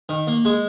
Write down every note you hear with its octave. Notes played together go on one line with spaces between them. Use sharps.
D#3
A#3
G#3